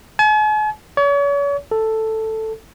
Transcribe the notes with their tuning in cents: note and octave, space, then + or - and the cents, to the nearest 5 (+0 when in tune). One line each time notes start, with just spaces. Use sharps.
G#5 +45
C#5 +40
A4 +5